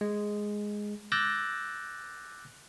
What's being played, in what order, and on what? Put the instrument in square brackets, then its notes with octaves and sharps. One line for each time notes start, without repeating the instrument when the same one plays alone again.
[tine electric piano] G#3
D6 E6 F#6 G6 A6 A#6